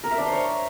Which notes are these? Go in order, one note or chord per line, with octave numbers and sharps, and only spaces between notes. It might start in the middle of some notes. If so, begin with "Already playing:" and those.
A#4
E5
D4
C5
C#5